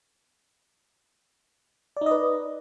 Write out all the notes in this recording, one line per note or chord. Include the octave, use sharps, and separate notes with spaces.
D#4 B4 D5 D#5